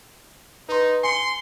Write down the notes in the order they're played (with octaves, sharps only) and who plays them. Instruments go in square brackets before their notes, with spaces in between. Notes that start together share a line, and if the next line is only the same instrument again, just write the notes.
[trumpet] D#4 [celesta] B4 C6
[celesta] G#5 C#7 [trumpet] C6